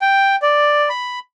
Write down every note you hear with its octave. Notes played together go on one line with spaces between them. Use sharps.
G5
D5
B5